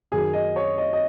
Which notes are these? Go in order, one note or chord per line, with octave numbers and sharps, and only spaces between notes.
F#2 D#3 F#3 G#4
D#5
C#5
D#5
D#5